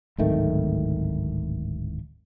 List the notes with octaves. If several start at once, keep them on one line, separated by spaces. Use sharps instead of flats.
D1 G#1 D#3 A3